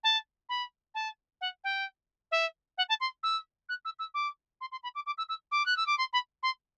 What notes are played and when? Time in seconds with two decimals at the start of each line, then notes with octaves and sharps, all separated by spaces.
0.03 A5
0.49 B5
0.94 A5
1.41 F#5
1.64 G5
2.31 E5
2.77 F#5
2.89 A5
3.00 C6
3.23 E6
3.69 F#6
3.85 E6
3.99 E6
4.14 D6
4.61 C6
4.71 C6
4.83 B5
4.95 D6
5.06 D6
5.18 E6
5.29 E6
5.51 D6
5.66 F#6
5.76 E6
5.86 D6
5.98 C6
6.13 B5
6.43 C6